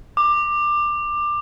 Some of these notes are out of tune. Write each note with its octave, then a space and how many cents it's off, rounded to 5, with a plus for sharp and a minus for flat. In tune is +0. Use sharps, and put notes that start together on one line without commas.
D6 +20